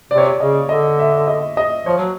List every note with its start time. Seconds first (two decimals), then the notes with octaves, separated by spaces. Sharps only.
0.11 C3 D5
0.18 C#5
0.25 D5
0.40 C#3 D#5
0.69 D3 D#5
0.99 E5
1.28 D#5
1.57 D#5
1.86 F3 C#5
1.98 F#3